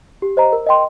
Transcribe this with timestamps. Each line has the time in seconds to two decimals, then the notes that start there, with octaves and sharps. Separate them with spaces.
0.22 G4
0.37 C5 D#5 A#5
0.52 A#4
0.66 D#5 G5 C6